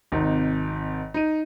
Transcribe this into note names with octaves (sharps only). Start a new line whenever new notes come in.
G#1 C3 D#4
D#4 D#7